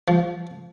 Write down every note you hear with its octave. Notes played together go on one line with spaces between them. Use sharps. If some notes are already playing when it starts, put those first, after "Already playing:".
F3